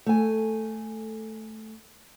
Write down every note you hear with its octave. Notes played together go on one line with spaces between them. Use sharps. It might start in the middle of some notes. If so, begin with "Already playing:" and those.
A3 G#5